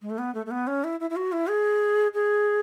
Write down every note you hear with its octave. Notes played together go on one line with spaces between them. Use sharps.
G#3
A3
B3
A3
A3
B3
C#4
E4
E4
E4
F#4
E4
G#4
G#4